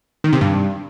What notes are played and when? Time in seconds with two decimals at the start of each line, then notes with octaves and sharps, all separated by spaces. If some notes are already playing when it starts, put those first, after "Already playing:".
0.24 D#3
0.33 C3
0.41 G2